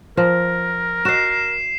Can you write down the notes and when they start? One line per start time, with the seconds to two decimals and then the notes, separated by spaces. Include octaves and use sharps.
0.17 F3 A#4
1.05 F#4 D#5 C7 E7